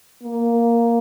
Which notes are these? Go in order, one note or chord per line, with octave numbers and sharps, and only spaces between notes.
A#3